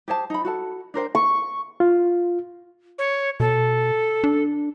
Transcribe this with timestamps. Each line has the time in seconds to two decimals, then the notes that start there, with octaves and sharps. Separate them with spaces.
0.08 G4 G#4 C5 A5
0.30 D#4 B5
0.45 F#4 A4 A5
0.94 D4 A#4 C5 G5
1.15 C#6
1.80 F4
2.98 C#5
3.40 B2 A4
4.24 D4